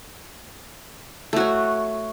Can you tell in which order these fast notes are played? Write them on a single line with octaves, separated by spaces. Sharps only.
A3 F#4 C#5